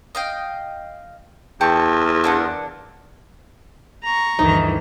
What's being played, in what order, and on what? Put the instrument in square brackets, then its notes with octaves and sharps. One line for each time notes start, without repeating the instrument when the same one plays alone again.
[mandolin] D#5 F5 G5
[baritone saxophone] E2 [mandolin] G4 A5 C#6
[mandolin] A#3 D4 F#5
[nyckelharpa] A#5 C#6
[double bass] D2 G2 [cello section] D#3 E3 [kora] D#4